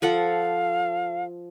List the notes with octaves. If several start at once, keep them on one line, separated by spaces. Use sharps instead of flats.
F3 A4 F5 F#5